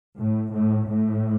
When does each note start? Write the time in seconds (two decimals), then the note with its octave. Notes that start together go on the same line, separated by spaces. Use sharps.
0.19 A2
0.54 A2
0.89 A2